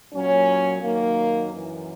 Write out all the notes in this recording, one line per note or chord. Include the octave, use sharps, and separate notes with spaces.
A#2 F#3 C#4
F#2 D#3 F#3 A#3
F#2 E3